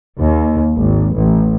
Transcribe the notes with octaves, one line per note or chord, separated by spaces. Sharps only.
D#2
G#1
A1